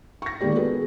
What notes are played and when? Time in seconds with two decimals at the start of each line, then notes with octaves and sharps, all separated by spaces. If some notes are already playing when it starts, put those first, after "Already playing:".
0.22 C#6 A#6
0.41 D#3 G#3 A#3 G4 D5
0.55 B3 F#4 G#4 A4 B4